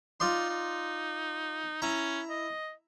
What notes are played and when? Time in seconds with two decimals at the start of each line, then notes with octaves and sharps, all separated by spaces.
0.20 D#4 F4 D5 C6
0.49 D#4
1.82 C#4 E4 A#5
2.29 D#5